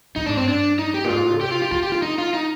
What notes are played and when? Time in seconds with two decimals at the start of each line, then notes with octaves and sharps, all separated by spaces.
0.16 A#2 D#4
0.26 G#2 D4
0.37 G2 C4
0.48 D4
0.79 D#4
0.94 G4
1.04 A#2
1.09 G#2 F4
1.33 D3
1.41 C3 G4
1.52 F4
1.62 G4
1.71 D#3 F4
1.83 G4
1.87 D3 F4
2.03 D#4
2.18 F4
2.34 D#4